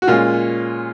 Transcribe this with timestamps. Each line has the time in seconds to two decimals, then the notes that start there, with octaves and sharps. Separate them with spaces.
0.02 F#4
0.07 A#2 G#3 C#4 F4